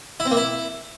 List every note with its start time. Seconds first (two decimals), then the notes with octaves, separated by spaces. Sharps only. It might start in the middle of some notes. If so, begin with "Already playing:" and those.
0.20 E4
0.25 C4
0.31 A#3
0.37 E4